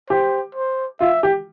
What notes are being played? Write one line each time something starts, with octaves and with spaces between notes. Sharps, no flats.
G4 C5
C5
F4 E5
G4